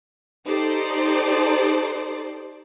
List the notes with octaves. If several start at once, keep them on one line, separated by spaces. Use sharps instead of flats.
D#4 G4 A4 C5 D5